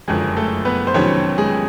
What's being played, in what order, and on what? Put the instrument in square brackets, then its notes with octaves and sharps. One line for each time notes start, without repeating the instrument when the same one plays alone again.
[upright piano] F#1 F2 D3 F#3 [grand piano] G#3 G#4
[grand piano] A3 A4
B3 B4
C5
[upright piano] F2 C3 D#3 F#3 B3 [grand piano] C#4 C#5
[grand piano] G#3 G#4